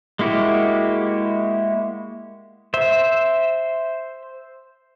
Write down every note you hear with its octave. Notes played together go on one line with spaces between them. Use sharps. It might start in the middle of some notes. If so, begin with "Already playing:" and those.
G#3 A#3 E4 F#4 G4
C5 E5